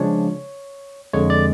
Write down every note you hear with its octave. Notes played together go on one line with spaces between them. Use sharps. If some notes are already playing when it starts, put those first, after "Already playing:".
Already playing: C#3 F3 G#3 D4 C#5
F2 D3 G#3 C#5
D5